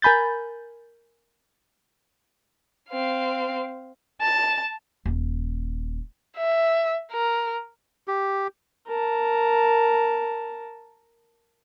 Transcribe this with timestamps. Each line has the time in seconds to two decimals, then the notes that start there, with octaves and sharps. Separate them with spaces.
0.02 A#4 G#5 B5 G6 A6
2.90 C4 F5
4.21 A5
5.06 D#1
6.38 E5
7.12 A#4
8.08 G4
8.88 A#4 A5